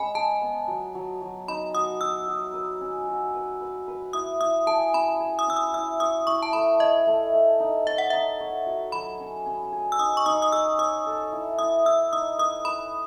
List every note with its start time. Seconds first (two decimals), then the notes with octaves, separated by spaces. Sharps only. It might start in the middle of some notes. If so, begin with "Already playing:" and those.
Already playing: G#3 C#4 G#5 B5
0.15 G#4 A5
0.42 B3
0.68 F#3
0.95 F#3
1.22 F#3
1.48 D#4 B5
1.74 F#4 D#6
2.01 F#4 E6
2.28 F#4
2.54 B4
2.81 C#4
3.08 F#4
3.34 B4
3.61 B4
3.88 B4
4.13 E4 D#6
4.40 E4 D#6
4.67 G#4 A5
4.94 C#4 B5
5.20 G#4
5.39 D#6
5.47 C#4 E6
5.56 D#6
5.74 E4 E6
6.00 C#5 D#6
6.27 E4 C#6
6.42 A5
6.53 A3 B5
6.80 A3 D#5
7.07 A3
7.33 A3
7.60 D#4
7.87 C#5 E5
7.98 F#5
8.10 D#4 E5
8.40 C#5
8.66 F#4
8.92 F#3 B5
9.19 C#4
9.46 C#4
9.72 G#4
9.92 E6
9.99 D#4 D#6
10.17 C#6
10.26 D#4 D#6
10.42 D#6
10.52 G#4 E6
10.79 C#5 D#6
11.06 A4
11.32 E4
11.59 E4 D#6
11.85 E4 E6
12.12 D#4 D#6
12.38 B4 D#6
12.65 B4 B5